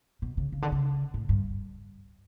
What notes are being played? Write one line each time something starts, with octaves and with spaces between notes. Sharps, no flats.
B2
C#3
C#3
D3
C#3
A2
G2